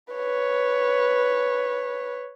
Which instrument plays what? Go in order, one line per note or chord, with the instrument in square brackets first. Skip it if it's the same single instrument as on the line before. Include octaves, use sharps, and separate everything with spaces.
[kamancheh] B4 C#5